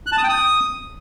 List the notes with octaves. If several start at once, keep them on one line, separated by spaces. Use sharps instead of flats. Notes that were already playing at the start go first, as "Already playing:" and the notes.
F#6
A5
D#6
G5
D#6